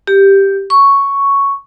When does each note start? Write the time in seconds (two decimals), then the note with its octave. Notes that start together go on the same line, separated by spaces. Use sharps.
0.07 G4
0.70 C#6